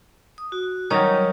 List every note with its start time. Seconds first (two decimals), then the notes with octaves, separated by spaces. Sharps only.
0.38 D#6
0.52 F#4
0.90 D#3 F#3 G3 C#4 D#4 C#5